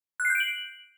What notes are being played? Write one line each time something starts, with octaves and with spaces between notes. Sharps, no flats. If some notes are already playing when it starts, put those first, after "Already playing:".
F#6
C7
G6
D7
F#7